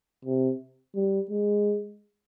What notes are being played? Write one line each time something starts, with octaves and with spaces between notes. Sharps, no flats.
C3
G3
G#3